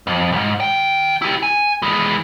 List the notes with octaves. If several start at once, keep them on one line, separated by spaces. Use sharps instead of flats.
F2
B1 G#2
D#3 G5
E4 G4
G#5
E3 G#3